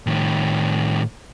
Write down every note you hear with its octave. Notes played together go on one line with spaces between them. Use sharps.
A2 D#3